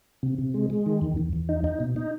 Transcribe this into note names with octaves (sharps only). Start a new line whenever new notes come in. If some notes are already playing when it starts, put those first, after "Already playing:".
C3
C3
G#3
G#3
D#3
E2
E2
E2
D#4
D#4
B2
D#4